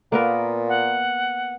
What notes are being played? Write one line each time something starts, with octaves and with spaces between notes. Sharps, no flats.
A#2 A#3 B3 A#4
F#5